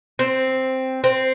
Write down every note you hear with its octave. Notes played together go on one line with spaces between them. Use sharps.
C4
C4